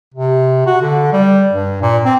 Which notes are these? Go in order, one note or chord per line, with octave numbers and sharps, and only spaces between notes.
C3
F#4
D3
G3
G2
A#2
C4